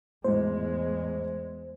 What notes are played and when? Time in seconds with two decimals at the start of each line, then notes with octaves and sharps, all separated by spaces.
0.24 G#1 E2 A2 G#3 C5